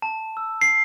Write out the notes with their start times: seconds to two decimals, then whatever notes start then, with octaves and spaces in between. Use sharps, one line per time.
0.02 A5
0.37 E6
0.61 C7